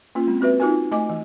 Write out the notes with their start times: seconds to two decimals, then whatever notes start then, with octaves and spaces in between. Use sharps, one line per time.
0.15 A#3 C#4 F4
0.27 G#3 C4
0.41 C4 F#4 B4 E5
0.60 D#4 F4 F#4 A#4 G#5
0.92 A3 D#5 G#5 D6
1.10 E3